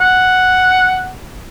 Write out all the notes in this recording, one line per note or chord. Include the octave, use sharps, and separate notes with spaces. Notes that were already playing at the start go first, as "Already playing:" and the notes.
F#5